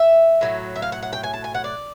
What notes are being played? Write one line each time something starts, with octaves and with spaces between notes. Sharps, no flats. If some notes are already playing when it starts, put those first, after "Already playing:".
Already playing: E5
A2 F#3 A3
E5
F5
F#5
F#5
G5
G#5
A5
G#5
F#5
D5